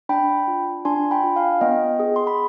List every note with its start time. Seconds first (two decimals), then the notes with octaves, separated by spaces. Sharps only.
0.09 D4 G5 B5
0.48 F4
0.85 D4 G#5 C6
1.11 G5 B5
1.24 F4
1.36 F5 G#5
1.61 B3 D#5 G5
2.00 G#4
2.16 C6
2.27 B5